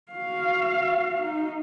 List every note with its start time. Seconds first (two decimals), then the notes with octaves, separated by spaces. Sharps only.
0.12 F#4 F5
1.22 D#4